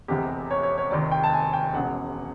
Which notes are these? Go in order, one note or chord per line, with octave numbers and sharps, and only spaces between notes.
F1 E2 C3 G4
C#5
C#5
C#5
F1 D#2 D#3 D5
G5
A5
G#5
G5
E1 E2 C#3 F#5